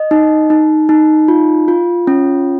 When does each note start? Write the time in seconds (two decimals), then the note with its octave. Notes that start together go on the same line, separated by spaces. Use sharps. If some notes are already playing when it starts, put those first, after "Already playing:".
Already playing: D#5
0.11 D#4
0.50 D#4
0.89 D#4
1.28 F4
1.68 F4
2.07 C#4